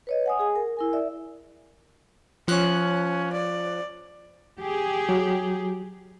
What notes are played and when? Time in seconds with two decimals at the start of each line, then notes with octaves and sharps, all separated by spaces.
0.07 B4 C#5 D#5
0.26 F#5 G#5 D#6
0.39 G#4 G#5
0.55 A#4
0.77 E4 A#4 G#5
0.93 D5 E5
2.48 F3 C#4 F#6
3.33 D5
4.59 G4 G#4
5.09 F#3